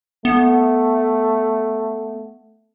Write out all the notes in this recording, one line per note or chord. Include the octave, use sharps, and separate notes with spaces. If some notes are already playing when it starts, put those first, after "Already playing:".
A3 B3